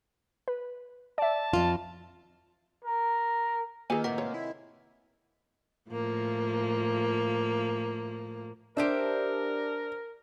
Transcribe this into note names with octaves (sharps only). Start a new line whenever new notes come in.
B4
D5 E5 A5
F2 F4
A#4
D#3 A#3 F4 G#4 B4 G#5
A2 C3 D#3 A#4 F#5
G#3 C#5
E4
A2 F3 A#3
D4 G4 A#4 C5 E5